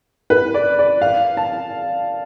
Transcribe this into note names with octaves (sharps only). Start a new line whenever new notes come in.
B4
D5
D5
F5
A5